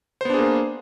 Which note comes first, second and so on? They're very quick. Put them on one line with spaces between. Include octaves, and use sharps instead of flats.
C5 B3 D4 G#4 A#3